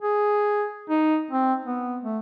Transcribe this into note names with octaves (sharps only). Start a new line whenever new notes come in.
G#4
D#4
C4
B3
A3